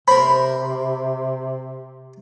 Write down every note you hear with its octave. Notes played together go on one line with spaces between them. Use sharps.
C3 A#4 C5 B5